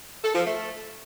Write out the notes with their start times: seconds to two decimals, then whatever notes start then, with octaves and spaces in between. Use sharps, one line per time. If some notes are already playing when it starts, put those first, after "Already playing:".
0.23 A4
0.34 F3
0.46 A3